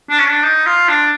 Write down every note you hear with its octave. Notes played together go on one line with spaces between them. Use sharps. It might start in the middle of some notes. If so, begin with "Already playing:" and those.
D4
C#4
D4
D#4
F4
D4